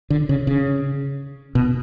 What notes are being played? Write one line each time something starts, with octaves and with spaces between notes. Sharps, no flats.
D3
C#3
C#3
B2